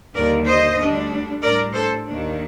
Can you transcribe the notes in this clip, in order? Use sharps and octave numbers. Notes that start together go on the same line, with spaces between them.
D#2 D3 G3 A#4 D5
C5 D#5
D2 D3 G3 D4
A2 G3 D4 A#4 D5
A4 C5
D#2 D#3 A#3 D4